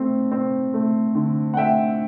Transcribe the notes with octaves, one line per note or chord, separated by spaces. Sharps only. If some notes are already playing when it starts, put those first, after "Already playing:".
Already playing: A3 C4
C4
A3
D3
F#5
A3 E5 G5